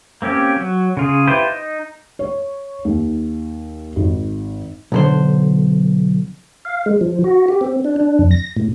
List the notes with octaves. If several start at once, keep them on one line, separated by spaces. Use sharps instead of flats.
A#3 C4 C#4 G4
F#3
C#3 F4 G#4
E4 F4 G4 B4 C5
D#4
C#5
D#2
G#1
B1 D3 C5
F5
G#3
F3
F#4
G4
C4
D4
D4
F2
A#6
A2